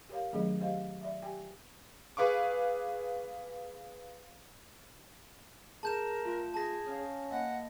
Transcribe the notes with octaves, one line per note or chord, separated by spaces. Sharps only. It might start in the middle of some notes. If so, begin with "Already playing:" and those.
G4 A#4 C#5 F5
D#3 F#3 A3 C#4 G#4 D#5
G4 C5 D#5 F5
D5 E5
G4 G5 G#5
G#4 B4 F5 C#6 D6
G#4 A#4 A5 G6 E7
A3 F4
G#4 A5 A#6
C#4 F5 D#6 F6
A#3 D#5 F#5 A#6